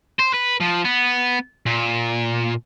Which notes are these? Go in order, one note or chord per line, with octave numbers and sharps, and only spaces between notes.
C5
B4
F3
B3
A#2